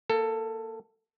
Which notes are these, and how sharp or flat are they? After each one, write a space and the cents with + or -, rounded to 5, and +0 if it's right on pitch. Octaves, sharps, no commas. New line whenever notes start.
A#3 +0 A4 +15